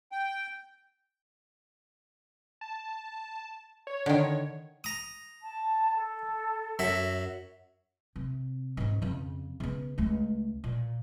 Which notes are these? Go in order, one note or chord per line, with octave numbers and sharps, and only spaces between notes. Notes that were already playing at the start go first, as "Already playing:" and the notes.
G5
A5
C#5
D3 D#3
A#5 D#6
A5
A4
F#2 F#3 E5
C3
G#2 C#4
F2 C#3
C#3 B3
C#2 A3
A#2